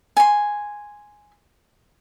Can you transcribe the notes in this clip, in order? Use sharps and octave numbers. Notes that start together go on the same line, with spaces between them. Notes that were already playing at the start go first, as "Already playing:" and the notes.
G#5 C6